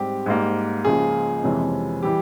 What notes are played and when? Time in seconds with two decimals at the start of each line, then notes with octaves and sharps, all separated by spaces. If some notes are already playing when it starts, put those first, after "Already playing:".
Already playing: G#2 G3 C4 G4
0.26 G#2 G3 A#3
0.85 C#2 C#3 F3 A#3 F4 G#4
1.44 F2 C3 E3 G#3 C#4
2.03 E3 G3 G4